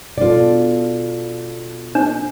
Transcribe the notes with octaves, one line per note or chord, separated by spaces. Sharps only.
B2 D4 F4 A4 D5
D4